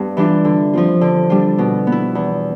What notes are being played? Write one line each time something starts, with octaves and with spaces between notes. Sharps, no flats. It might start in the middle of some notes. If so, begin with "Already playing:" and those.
Already playing: G2 B3
E3 G3 D4 F4
D3
F3 C4 F4
D3
G3 D4 F4
B2
B3
E4
E2